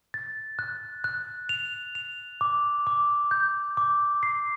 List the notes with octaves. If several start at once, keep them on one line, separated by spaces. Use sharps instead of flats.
A6
F#6
F#6
F7
F7
D6
D6
G6
D6
C7